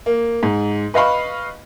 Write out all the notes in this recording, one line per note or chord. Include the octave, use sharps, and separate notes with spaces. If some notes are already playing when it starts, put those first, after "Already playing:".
A#3
G#2
B4 D#5 F5 B5 C#6